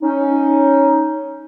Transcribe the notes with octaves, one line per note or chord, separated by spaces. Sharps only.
C#4 D#4